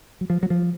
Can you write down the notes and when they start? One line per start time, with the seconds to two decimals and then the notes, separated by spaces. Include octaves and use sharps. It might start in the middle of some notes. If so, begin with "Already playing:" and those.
0.21 F#3
0.30 F3
0.43 F#3
0.50 F3